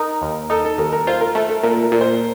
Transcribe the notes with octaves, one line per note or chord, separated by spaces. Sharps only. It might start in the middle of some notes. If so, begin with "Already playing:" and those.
Already playing: D#4 A#4
D#2
D#4 A4
A4
D#2 A#4
A#4
F4 C5
A#4
A3 A4
A4
A#2 A#4
A#4
A#2
C5